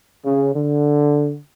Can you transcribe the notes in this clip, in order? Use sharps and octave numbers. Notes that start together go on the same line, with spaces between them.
C#3
D3